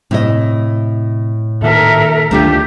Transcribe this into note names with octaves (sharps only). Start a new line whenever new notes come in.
A2 C3 E4 D#5
A#2 D#3 A4 A#4 E5
D2 D#3 A3 D4 F4 G4